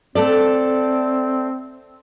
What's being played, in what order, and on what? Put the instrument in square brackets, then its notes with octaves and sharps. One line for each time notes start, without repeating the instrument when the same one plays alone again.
[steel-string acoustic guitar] A3 A4 D5 [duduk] C4